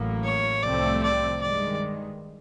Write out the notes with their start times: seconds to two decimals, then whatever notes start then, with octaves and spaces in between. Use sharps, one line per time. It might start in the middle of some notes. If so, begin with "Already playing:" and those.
Already playing: A1 A2 F#3 A#3
0.24 C#5
0.63 C2 C3 F3 A3 C4 D5
1.03 D5
1.41 G2 D#3 G#3 D5